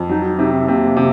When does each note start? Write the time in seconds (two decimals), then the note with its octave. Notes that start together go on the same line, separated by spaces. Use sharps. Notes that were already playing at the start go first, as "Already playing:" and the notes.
Already playing: F2
0.09 F#3 D#4
0.25 D#4
0.39 C3 D#4
0.53 C4
0.68 C3 A#3
0.97 C3